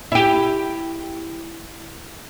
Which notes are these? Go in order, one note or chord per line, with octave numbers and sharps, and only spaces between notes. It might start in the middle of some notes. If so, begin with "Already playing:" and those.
E4 G4